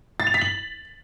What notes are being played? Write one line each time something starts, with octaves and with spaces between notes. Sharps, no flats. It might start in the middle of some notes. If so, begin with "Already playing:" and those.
A6
F7
B6
F#7